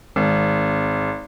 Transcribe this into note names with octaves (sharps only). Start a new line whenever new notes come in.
G#1